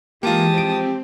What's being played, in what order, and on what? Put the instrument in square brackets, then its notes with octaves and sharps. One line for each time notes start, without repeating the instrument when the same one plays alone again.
[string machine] E3 [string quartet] G#3 A5 D#6 [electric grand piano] A#3 F4 [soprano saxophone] G4
[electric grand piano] F3 D7 [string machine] C4